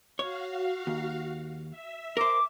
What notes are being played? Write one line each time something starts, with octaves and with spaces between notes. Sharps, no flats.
F#4 C#5 F5
D#2
E5
A#4 C5 D6